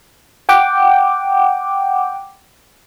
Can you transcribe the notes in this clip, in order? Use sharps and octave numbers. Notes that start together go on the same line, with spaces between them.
F#5 G5 D6